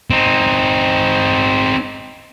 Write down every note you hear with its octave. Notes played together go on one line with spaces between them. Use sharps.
C4 D#4